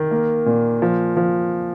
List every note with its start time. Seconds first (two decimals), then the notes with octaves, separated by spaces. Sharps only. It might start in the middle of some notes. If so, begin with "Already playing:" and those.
Already playing: D#3
0.11 A#3
0.46 A#2
0.82 F3
1.17 F3